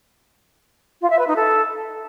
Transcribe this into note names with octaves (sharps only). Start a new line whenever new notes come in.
F4
E5
B4
D#4
A4